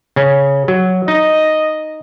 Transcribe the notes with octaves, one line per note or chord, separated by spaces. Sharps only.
C#3 C#4
F#3
D#4 D#5